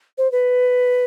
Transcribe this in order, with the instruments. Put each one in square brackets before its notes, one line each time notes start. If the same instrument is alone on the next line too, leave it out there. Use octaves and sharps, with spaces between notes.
[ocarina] C5
B4